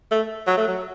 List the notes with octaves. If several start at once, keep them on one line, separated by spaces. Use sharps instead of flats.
A3
F#3
A3
F#3